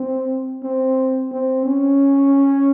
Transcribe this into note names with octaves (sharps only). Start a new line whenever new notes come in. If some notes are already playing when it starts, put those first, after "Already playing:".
Already playing: C4
C4
C4
C#4